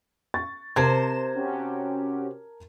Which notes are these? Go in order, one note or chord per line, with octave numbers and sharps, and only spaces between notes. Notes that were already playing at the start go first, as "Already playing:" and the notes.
C#6 A6
C3 A#4 C5 A5 G#6 E7
C#4 F#4 G4